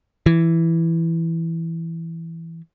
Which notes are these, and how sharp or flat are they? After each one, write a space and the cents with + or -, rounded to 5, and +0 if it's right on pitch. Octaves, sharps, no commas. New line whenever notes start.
E3 +5